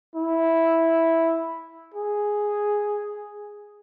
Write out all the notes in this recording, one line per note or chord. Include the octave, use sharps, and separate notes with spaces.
E4
G#4